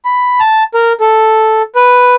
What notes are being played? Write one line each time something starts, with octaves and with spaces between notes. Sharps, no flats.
B5
A5
A#4
A4
B4